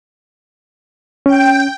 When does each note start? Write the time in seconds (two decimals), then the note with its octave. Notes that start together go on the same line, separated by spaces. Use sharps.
1.26 C#4 G5